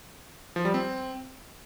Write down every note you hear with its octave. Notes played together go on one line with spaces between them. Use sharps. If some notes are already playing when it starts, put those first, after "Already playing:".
F3
G3
C4